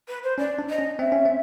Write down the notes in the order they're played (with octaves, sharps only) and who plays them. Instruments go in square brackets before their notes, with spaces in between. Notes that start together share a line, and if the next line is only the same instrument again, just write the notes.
[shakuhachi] B4
C5
[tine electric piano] C#4 [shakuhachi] D5
[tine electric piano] D4
[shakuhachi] D#5
[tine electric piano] C#4
[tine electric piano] C4 [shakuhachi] E5
[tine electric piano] C#4
C4